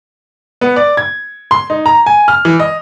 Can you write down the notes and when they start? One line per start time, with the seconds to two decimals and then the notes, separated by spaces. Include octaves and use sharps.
0.61 B3
0.76 D5
0.97 G#6
1.51 C6
1.70 D#4
1.86 A#5
2.06 G#5
2.28 F6
2.45 E3
2.60 D#5